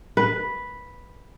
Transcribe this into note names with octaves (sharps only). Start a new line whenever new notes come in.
B4